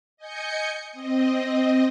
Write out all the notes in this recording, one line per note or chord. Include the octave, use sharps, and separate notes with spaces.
D#5 G#5 G6 C#7
C4 D#5